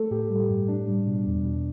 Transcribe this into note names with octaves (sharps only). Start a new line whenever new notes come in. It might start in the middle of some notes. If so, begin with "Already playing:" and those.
Already playing: A3 A4
A2 G4
G3
G2
A2 D4
G3
B2
E2
B2